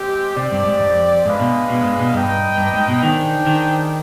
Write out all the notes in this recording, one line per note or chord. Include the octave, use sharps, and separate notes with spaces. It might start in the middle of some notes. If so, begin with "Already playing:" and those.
Already playing: G#3 C4 G4
C3 C4 G4 D5
G2
G#2
F2
G#2 G#3 D4 G#4 B4 F5
B2
B2
G#2
B2
G2 D#4 B4 D#5 G5
G2
G#2
B2
D#3 D4 G#4 C5 G5
D#3